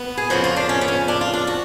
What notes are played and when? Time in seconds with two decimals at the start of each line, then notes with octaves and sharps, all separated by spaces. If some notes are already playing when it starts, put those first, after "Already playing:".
Already playing: B3
0.18 G#4
0.30 F2 C#3 F3 F#4
0.44 F4
0.56 D4
0.69 C#4
0.81 B3
0.88 C#4
1.08 D4
1.21 F4
1.34 D4
1.47 F#4